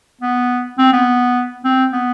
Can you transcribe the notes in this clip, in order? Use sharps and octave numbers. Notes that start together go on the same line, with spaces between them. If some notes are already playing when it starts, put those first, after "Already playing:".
B3
C4
B3
C4
B3